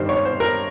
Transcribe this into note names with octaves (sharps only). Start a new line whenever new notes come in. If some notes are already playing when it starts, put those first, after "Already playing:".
Already playing: G2 D#3 G3 C5
C#5
C5
A#4